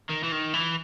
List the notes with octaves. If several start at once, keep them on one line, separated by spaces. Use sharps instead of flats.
D#3
E3
D#3
E3